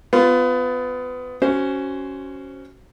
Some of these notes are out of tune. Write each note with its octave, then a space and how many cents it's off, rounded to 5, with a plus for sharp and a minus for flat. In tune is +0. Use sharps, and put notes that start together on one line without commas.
B3 +25 F4 +0
C#4 +0 F#4 +20 C5 +0